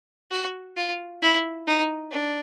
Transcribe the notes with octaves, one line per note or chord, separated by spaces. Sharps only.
F#4
F4
E4
D#4
D4